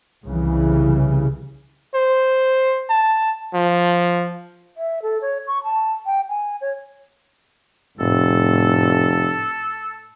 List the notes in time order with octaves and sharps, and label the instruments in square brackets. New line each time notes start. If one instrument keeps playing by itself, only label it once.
[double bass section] C2 C#3 E3
[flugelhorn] C5
A5
F3
[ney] E5
A4
C#5
C#6
A5
G5
G#5
C#5
[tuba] F1 [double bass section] A2 [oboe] A4